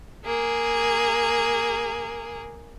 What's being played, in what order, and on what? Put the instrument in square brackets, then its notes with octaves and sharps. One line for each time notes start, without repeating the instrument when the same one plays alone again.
[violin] A#3 G#4